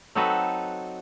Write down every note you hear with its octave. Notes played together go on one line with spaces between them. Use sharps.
F#3 C4 D#4 F#4 A4 B4